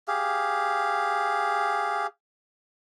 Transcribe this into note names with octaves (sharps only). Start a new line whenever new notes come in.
G4 G#4 F5